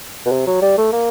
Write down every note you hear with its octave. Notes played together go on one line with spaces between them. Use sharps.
B2
C3
F#3
G3
A3
A#3